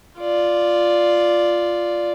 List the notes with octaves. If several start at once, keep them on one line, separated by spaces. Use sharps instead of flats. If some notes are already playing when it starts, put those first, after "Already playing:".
F4 D5